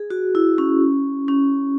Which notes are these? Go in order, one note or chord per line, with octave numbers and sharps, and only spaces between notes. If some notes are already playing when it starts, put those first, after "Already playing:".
Already playing: G#4
F#4
E4
C#4
C#4